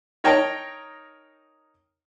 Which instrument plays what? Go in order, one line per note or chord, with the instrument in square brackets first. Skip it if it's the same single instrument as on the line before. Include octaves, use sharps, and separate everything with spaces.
[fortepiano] D#4 A#4 C#5 G5 A5 A#5